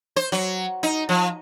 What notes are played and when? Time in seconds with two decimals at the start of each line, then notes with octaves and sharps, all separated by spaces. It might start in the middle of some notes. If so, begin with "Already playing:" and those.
0.16 C5
0.32 F#3
0.83 D#4
1.09 F3